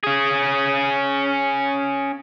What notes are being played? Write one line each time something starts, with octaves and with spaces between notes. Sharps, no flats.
C#4 G#4